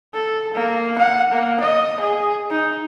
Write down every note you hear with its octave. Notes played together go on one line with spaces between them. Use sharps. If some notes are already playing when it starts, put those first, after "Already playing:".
A4
A#3
F#5
A#3
D#5
G#4
D#4